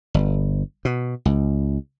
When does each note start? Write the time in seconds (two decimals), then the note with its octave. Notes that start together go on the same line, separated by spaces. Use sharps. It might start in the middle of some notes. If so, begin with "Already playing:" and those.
0.14 G1
0.85 B2
1.25 C#2